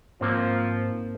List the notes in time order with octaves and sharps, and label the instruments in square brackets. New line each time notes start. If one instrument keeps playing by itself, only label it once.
[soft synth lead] G#2 [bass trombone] F3 [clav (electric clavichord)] A#3 C4